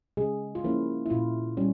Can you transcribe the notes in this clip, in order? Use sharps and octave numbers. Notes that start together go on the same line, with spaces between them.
C#3 G#3 G#4
F4
F3 A#3 C#4 E4
E4
A#2 F4
G3 C#4